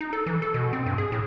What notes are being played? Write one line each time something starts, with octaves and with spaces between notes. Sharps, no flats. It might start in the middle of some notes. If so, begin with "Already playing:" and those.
D#4
A4
E3
A4
B2
C4
G2
G#4
A2